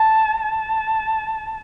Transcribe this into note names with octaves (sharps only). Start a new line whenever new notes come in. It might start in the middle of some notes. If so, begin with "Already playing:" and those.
Already playing: A5
A5